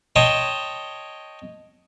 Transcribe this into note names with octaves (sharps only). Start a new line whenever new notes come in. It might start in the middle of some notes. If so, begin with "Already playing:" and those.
C#5 D#5 G5 A5 C6